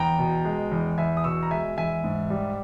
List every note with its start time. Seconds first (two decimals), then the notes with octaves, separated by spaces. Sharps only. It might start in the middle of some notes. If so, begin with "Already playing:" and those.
Already playing: E2 G5 A#5
0.19 B2
0.45 G#3
0.71 E2
0.98 E2 E5 G#5
1.17 D#6
1.24 B2 C#6 E6
1.43 A#5
1.51 G#3 E5 G#5
1.77 E2 E5 G#5
2.04 G#2
2.30 G3